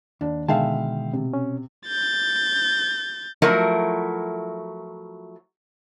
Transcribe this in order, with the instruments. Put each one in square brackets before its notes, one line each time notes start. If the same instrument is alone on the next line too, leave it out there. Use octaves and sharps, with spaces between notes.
[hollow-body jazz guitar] D#2 [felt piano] D4
[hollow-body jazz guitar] B2 A5 [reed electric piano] D3 D#3 G#3 [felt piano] E5 F5 G5
[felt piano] C3
[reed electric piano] C#4
[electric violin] G6 A6
[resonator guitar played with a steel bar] F3 F#3 A3 E4 F#4 A#4